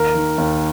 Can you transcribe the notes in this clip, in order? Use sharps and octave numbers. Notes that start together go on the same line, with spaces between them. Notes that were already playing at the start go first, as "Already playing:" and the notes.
Already playing: D#2 A#4
D#3
D#2